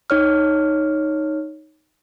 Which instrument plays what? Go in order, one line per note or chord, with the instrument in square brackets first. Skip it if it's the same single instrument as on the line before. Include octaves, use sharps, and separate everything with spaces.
[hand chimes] D#4 C#5 F6